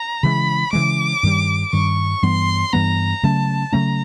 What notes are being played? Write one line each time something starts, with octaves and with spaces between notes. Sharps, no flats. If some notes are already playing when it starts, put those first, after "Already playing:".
Already playing: A#5
C#3 E3 G#3 B5
C#3 E3 G#3 D6
G2 D#3 G3
G2 D#3 G3 C#6
G2 E3 G3 B3 C6
G2 E3 G3 B3 A#5
C#3 F#3 A3 C#4 A5
C#3 F#3 A3 C#4 A#5